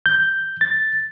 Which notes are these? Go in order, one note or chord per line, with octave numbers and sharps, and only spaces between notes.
G6
A6